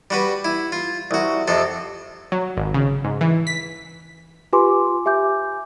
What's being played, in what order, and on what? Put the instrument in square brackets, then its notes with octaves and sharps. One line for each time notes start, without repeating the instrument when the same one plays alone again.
[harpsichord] G3 F#4 B4
E4
F4
C2 F#4
F2 C3 A4
[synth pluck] F#3
G#1
C#3
G#2
E3
B6
[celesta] F4 G4 B4 G#5 C6 D6
G4 E5 G#5 D6 G6